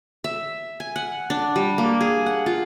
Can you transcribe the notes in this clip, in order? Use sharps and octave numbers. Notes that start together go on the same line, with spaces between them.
E5
G#5
F#5
D4
G3
A#3
G#4
F#5
F4